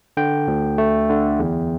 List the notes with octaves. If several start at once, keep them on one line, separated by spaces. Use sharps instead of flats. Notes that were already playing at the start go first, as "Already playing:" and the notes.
D3 G5
D2
A3
D3
E2